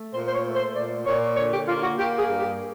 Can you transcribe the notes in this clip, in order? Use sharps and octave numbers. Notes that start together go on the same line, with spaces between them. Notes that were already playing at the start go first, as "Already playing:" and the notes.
Already playing: A3
A#2 C5
C5
C#5
A3
C5
A#2 D5
A#2 C#5
D3 C#5
G4
A#3 F4
F#4
A#3 G4
G#4
G2
G4